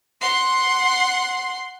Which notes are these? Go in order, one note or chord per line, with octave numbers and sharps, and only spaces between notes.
F#5 C6